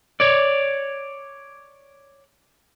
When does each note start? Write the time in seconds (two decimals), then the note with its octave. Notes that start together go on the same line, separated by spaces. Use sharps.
0.20 C#5 D5